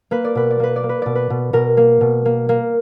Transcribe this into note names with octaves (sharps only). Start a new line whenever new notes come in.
A#3 B4
D5
B2 B4
D5
A#3 B4
D5
A#3
B4
B2 D5
B4
B2
B2 A#4
A#3
B2
A#3
A#3